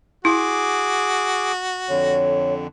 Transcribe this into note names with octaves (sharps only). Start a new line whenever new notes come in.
E4 F#4 G#4 D6
F2 D3 C#5